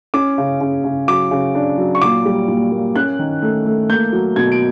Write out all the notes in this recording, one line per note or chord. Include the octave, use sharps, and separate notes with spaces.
C#4 D6
C#3
C#3
C#3
F#3 D6
C#3
D4
F#3
C#6
A#2 D6
G3
A#2
A#3
C#4 F#6
D#3
A3
A3
A#3 G6
F#3
B2 G#6
D7